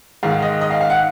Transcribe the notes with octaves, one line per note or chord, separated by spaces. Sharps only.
G#2 D#3 G#3 F5
D#5
D#5
F5
F5
F#5